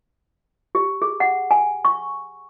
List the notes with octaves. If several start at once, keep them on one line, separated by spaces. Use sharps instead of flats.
G4
G#4
F#5
G#5
C#6